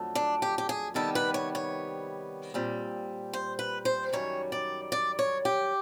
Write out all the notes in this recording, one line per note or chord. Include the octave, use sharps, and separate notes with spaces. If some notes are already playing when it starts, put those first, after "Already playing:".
Already playing: F2 D3 F#3 A3
D4
G4
G4
G#4
C3 D#3 G3 B3 A4
B4
C#5
C#5
A#2 G3 C4
C5
B4
C5
F#2 D#3 G3 C#5
D5
D5
C#5
G4